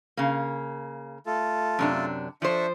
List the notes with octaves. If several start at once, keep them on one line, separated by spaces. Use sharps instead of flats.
C#3 A#3
A3 F4 A4
F#2 C3 D4
F3 D4 C5 E5 C#6